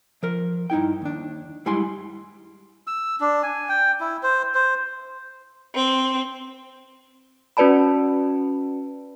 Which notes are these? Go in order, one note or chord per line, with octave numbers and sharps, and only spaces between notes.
F3 A#4
G2 D#4 E4 G5
D#2 D4
F#2 G3 G#3 E4 G#5 C6
E6
D4
G#5
G5
E4
C5
C5
C4
C#4 F#4 B4 D5 A5 B5